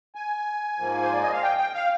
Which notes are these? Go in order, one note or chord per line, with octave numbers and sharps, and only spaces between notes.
G#5
G#2 F3 A#3
C5
D5
D#5
F5
G5
G5
F5